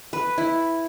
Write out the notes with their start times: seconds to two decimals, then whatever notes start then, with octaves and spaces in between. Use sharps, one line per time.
0.13 B4
0.38 E4